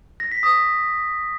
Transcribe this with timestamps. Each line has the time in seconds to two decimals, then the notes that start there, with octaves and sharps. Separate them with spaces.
0.20 A#6
0.32 B6
0.43 D#6